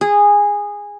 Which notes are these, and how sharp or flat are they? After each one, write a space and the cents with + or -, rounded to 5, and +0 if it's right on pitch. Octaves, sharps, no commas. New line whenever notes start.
G#4 -15